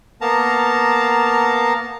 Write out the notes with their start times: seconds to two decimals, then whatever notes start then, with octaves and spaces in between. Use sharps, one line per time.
0.21 A#3 B3 A#4 A5 A#5